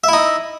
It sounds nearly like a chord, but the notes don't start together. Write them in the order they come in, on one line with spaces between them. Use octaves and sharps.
E5 E4 D#4